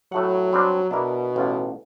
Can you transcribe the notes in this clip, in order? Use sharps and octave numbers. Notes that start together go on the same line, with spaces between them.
A2 F#3 A3 F#5
G3 C4 D4
B2 D4 E4 A#4
A1 F4